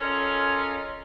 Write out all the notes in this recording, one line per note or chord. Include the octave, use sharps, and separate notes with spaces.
C#4 F4 A4 A#4 C#5 D#5